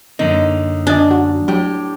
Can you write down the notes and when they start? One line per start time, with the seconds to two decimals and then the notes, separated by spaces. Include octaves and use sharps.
0.19 F#2 D3 A#3 D#4
0.87 D4 D#5 G#5
1.11 F#4
1.48 A2 F#3 G4